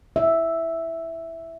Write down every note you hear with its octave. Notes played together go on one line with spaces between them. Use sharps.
E5